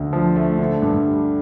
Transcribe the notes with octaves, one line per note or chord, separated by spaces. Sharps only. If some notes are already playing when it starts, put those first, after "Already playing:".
Already playing: D2 D3
F3
A3
D3
G2
G3